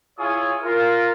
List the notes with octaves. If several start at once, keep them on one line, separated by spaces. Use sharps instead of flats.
E4 F4 G#4 C#5 G#5 D#6
F4 A#4